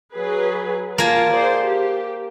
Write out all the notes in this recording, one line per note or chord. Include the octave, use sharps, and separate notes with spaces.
F#3 G#4 B4
A#3 F4 G#5 A5
G#4 C5 D5
G4